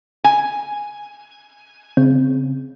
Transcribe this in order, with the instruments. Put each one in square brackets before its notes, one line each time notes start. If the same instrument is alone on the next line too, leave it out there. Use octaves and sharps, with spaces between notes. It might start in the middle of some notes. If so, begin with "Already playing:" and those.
[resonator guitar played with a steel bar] G#5
[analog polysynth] C#3 [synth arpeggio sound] C4